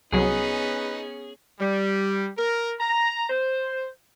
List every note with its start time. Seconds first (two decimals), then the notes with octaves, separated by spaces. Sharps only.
0.12 C2 F#3 B3 C#4 D#4 G#4 B4
1.60 G3
2.37 A#4
2.80 A#5
3.30 C5